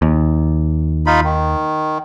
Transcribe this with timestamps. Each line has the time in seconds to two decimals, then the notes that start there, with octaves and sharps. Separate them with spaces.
0.02 D#2
1.06 D#4 F4 B5
1.24 D#3